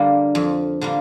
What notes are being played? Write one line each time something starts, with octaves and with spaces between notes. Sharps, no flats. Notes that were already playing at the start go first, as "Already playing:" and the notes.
Already playing: D3 G3 A#3
F2
D3 G3 A#3